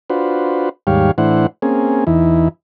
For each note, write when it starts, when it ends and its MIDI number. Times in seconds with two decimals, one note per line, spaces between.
0.10 0.69 62
0.10 0.69 65
0.10 0.69 66
0.10 0.69 71
0.10 0.69 72
0.87 1.11 39
0.87 1.11 44
0.87 1.11 55
0.87 1.11 67
0.87 1.11 73
0.87 1.11 77
1.18 1.47 45
1.18 1.47 52
1.18 1.47 62
1.18 1.47 64
1.18 1.47 72
1.18 1.47 78
1.62 2.04 58
1.62 2.04 60
1.62 2.04 61
1.62 2.04 68
2.07 2.48 40
2.07 2.48 52
2.07 2.48 63
2.07 2.48 64